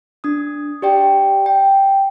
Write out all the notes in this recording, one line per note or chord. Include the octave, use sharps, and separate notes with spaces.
D4 D#6
G4 D5 G5
G5